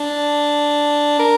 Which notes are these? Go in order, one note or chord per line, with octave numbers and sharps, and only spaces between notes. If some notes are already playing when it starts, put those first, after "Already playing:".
Already playing: D4
A#4